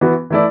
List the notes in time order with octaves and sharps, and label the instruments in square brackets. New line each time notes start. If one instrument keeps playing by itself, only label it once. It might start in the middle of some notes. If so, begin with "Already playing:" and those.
[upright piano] E3 B3 F#4
E3 A3 E4 D5